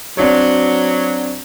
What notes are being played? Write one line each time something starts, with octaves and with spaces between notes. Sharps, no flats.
F#3 C4 D4 C#5